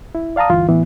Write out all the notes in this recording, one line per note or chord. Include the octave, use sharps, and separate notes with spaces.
E4
D5 F5 A5 A#5 D#6
D2 G2 E3 F4
A2 E3 B3